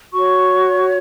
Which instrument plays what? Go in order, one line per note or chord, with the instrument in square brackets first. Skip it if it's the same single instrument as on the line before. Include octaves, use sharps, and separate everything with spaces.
[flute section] F#4 C#5 C#6